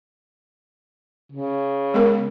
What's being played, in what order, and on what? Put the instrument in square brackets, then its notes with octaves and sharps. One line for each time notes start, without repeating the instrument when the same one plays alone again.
[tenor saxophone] C#3
[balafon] G#3 B3 A#4